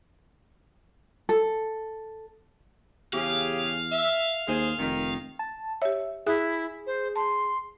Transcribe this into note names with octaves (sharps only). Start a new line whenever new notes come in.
A4
E2 C#3 G4 G#4 F5
E5
D#2 G#4 C5
F1 D#3
A5
G4 C#5 E5
E4 G#4 E5 D#6 F#6
C5
A5 C6